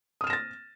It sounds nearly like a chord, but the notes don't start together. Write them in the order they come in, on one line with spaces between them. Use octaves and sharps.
D#6 F6 E7 A#6 A6